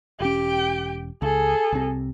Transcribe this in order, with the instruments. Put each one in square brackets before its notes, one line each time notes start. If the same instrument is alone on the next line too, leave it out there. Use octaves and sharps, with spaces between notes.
[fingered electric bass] E1 C#4 [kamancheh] G4 G5
[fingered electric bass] C#2 [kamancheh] G#4 A4
[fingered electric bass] C2 C3